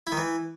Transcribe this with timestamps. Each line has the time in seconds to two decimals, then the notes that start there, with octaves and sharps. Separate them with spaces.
0.07 E4
0.12 D#3
0.17 E3